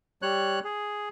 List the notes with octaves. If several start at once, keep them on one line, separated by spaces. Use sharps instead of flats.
G3 C#5 F#6
G#4